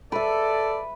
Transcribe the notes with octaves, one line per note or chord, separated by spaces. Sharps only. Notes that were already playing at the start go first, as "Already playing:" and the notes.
A4 B4 D5 E5